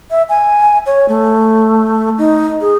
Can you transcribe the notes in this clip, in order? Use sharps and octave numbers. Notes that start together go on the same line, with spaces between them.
E5
G#5
C#5
A3
D#4
G#4